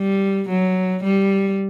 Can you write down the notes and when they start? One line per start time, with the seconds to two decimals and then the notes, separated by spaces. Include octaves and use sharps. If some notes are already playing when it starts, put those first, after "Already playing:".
Already playing: G3
0.49 F#3
1.04 G3